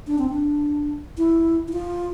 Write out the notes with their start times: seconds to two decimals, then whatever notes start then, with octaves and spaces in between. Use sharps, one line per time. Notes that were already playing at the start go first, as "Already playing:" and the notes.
0.07 D4
0.19 C4
0.29 D4
1.18 E4
1.68 E4
1.73 F4